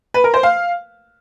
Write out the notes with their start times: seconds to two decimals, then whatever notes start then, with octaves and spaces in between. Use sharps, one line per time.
0.14 B4
0.24 A#4
0.34 C5
0.43 F5